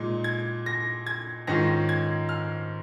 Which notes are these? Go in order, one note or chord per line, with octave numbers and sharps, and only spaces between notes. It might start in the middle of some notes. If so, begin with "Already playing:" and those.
Already playing: A#2 G#3 D#4
G#6
A#6
G#6
G#2 D#3 C#4 F4 A#6
G#6
F6